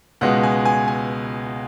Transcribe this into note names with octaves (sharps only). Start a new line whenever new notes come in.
C#2 B2 G#3 F#5
G#5
G#5
G#5